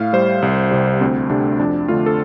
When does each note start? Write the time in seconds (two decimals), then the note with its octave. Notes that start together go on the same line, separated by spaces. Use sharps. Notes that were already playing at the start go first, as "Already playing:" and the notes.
Already playing: A2 F5
0.13 G3 C5
0.42 C2
0.71 C3 G3
1.01 D2 C4
1.30 C3 A3 D4
1.59 F2 D4
1.88 D3 A3 F4
2.06 A4